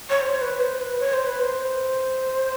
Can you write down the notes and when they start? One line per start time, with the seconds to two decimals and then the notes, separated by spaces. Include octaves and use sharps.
0.10 C#5
0.21 C5
0.41 B4
0.60 C5
0.80 B4
1.00 C#5
1.14 C5
1.26 B4
1.41 C5